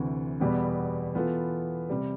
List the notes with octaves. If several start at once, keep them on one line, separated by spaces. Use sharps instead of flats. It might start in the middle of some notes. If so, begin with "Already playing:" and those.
Already playing: D2 C3 E3
E2 B2 G3 B3
E3 B3 F4 A4
C3 G3